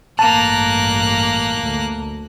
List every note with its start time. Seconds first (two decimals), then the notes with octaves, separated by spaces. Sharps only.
0.19 A1 G2 A#3 A5 F#6
1.59 D2